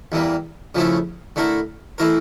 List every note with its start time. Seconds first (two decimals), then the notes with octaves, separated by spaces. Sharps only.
0.12 E2 E3 G3 A#3
0.75 C#3 F3 A3 E4 A4
1.36 D3 A3 E4 A#4
1.98 E3 A3 E4 A#4